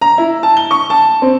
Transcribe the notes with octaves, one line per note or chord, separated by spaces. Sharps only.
A#5
E4
A5
G7
C#6
A5
C4